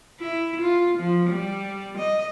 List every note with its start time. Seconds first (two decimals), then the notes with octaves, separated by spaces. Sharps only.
0.20 E4
0.61 F4
0.98 F3
1.29 G3
1.97 D#5